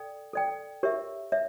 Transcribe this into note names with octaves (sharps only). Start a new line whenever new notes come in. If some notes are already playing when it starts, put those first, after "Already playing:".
Already playing: A4 D5 G5
A4 D5 G5
G4 A#4 C#5 E5
C#5 E5